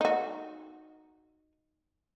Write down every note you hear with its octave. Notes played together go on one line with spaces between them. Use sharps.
D#4 F#4